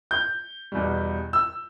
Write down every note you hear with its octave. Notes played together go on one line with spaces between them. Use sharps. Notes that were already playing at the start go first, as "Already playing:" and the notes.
G6
E2 B2 G3
E6